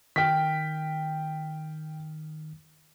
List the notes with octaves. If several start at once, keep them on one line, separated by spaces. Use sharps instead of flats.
D#3 G5 F6 B6